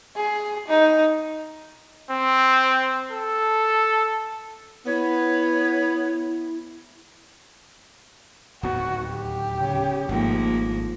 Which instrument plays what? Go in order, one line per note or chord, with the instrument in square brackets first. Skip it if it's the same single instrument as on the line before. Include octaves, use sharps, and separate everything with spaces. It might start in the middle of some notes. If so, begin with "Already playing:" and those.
[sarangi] G#4
D#4
[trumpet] C4
A4
[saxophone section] B3 [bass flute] E4 [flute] C#5
[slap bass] D1 D#2 B3 [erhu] F#4
[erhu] G4
[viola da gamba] C#3
[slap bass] G#1 A3 [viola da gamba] G#2 F3 A#3